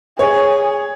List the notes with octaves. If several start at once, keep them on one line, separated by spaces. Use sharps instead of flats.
G#4 C#5